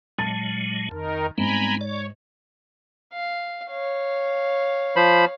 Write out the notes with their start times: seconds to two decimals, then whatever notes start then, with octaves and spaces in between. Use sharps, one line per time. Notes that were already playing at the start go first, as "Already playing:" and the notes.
0.18 A#2 F#3 G#3 A5 A6
0.91 F2 D#3 D#4 A#4
1.38 G#2 G3 B3 C4 G#5 A#5 B5
1.81 C#5 D5
3.13 F5
3.71 C#5 F5
4.96 F3 C5 B5